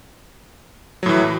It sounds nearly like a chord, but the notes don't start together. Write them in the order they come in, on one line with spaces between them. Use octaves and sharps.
F#3 A2 E3